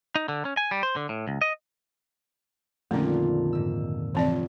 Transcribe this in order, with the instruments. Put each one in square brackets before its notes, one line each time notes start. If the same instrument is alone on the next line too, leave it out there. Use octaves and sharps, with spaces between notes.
[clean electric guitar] D#4
D3
C#4
G#5
G3
C5
D3
A2
C#2
D#5
[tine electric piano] F2 A#2 D#3 [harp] D3 F4 [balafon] A3 C#4
[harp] G#2 E6
[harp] F1 [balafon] E3 C4 D5